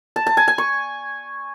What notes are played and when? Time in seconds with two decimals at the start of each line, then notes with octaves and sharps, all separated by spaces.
0.16 A5
0.27 A5
0.37 G#5
0.48 G#5
0.58 C#6